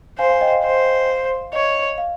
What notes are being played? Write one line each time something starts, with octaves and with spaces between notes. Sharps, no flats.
C5 F5 G#5
F5 G#5
D#5 G5
F5
C5
C#5 D#5
F5